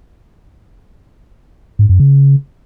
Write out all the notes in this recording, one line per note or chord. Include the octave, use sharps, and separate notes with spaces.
G#2
F#2
C#3